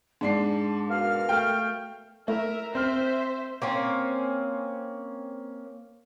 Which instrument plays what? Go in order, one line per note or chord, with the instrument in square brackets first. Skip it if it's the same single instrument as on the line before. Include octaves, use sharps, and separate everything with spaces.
[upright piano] G#2 D4 C7 [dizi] A5
[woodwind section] B2 A#4 F5 [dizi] F6
[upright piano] A3 G5
[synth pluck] A3 E4 [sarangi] A#4 [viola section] E5
[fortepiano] C4 F6 [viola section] C5 [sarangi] E5
[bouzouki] A#3 C4 C#4